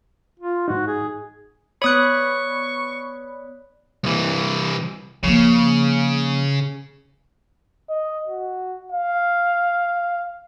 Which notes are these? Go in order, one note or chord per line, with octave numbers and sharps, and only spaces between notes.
F4
G#2 D#4 F#4
G#4
B3 C#5 D5 B5 C#6 D#6 F#6
C2 E3
C#3 F3 A#3
D#5
F#4
F5